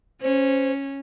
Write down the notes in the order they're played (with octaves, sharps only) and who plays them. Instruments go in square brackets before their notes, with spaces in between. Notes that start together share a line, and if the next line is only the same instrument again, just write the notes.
[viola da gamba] C#4 [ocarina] C5